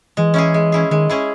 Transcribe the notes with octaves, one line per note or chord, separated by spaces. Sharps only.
E3 G#3
C#4 E4 G#4
G#3
C#4 E4 G#4
D#3 G#3
C#4 E4 G#4